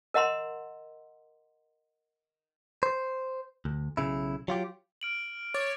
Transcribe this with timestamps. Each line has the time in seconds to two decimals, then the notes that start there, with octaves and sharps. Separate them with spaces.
0.14 A#4 D#5 F#5 A#5 C6
2.83 C5
3.65 D2
3.97 B1 C#3 E4
4.48 F#3 F4 G4
5.01 F6 D7 F#7
5.54 C#5 D6 A6